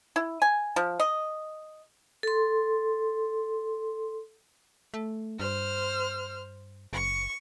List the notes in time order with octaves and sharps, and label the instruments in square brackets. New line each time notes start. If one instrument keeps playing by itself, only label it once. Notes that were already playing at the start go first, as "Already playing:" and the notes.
[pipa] E4
G#5
F3
D#5
[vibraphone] A4 C6
[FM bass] A3
[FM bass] G2 [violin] C5 F6
[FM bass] F#1 [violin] C#6